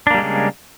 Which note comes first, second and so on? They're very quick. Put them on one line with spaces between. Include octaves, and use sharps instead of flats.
D4 A#3 G3 G#3 C#3